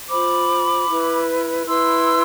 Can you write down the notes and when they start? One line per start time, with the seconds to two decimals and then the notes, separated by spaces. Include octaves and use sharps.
0.10 F4 C5 B5 D6
0.89 E4 B4
1.67 E4 B4 C6 E6